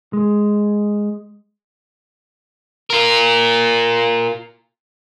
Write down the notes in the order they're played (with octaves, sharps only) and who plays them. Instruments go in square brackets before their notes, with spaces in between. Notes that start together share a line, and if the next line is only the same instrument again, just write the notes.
[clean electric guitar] G#3
[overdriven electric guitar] F4 A#4